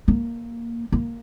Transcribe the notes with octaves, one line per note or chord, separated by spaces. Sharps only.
A#3
A#3